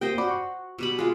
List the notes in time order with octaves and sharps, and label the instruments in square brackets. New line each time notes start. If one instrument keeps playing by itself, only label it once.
[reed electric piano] A#3 C4 G4 [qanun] C5 D#5 G5
[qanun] F#4 [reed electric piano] D5 B5 D6
[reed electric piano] C#6
[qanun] B2 G3 B5
G#3 F4